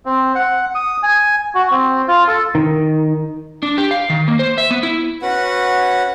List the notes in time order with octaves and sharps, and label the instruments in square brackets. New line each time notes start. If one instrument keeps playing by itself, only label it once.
[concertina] C4
F#5
D#6
G#5
F#4
C4
F4
A4
[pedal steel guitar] D#3
[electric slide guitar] D4
G4
F5
D#3
A#3
C5
E5
B3
E4
[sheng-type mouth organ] C#4 F#4 B4 F#5